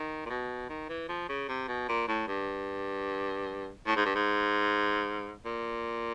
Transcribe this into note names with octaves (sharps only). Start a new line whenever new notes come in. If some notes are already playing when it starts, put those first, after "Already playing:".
Already playing: D#3
A#2
B2
D#3
E3
F3
C#3
C3
B2
A#2
A2
G2
A2
G#2
G2
G#2
A#2